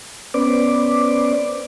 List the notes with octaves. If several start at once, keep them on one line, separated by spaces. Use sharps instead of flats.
B3 C#4 B4 C5 D5 D6